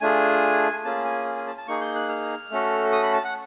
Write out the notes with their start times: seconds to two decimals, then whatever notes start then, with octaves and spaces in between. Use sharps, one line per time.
0.01 A3 D4 F4 G#4 G#5
0.85 A#3 C#4 F4 G#4 A5
1.05 G#5
1.37 G#5
1.47 A5
1.58 A5
1.67 A#3 D#4 G#4 C#6
1.81 G6
1.96 F#6
2.09 F6
2.51 A3 C#4 F#4 A4
2.92 D#6
3.03 B5
3.13 A5
3.24 F#5